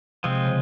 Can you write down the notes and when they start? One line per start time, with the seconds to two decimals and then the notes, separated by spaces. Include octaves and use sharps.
0.24 C3 F3 G#3 C4
0.46 C#3